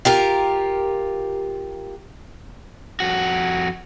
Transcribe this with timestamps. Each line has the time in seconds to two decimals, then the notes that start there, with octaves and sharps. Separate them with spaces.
0.05 F4 G4 A#4
3.00 F2 F#4